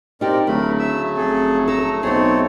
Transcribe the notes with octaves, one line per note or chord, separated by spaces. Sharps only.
C4 D#4 G4 A#4 D5
D1 D2 C#3 F#3 A3 A#4 B5
E5 E6
F1 G#4 A4
A4 A#5 E6
B1 C4 D#4 G#4 A4 C#5